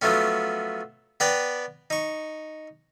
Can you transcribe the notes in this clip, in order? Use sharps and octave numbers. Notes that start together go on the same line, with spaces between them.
F3 F#3 A3 B3 C#4
B3 B4 D5 G5 A#5
D#4 C#6